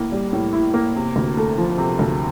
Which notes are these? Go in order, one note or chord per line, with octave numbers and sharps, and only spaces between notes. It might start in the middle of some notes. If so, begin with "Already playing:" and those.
Already playing: A2 A#3 E4
G3
A2
E4
A#3
C3
D2
A3
F3
C3
D2